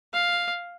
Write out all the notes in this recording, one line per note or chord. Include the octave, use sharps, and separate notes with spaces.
F5